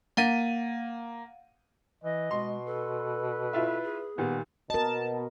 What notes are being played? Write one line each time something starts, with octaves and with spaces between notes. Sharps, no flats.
A#3 F5 F#5 A6 D#7
E3 D#5
B2 G#3 C6
A4 B4
E4 F4 E5
G#4
A#2 D#3 G3 B3
B2 A#4 D#5 A5